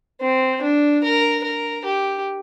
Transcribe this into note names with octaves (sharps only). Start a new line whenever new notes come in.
C4
D4
A#4
A#4
G4